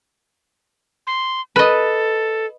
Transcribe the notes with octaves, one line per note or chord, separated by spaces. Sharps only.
C6
A4 B4 D#5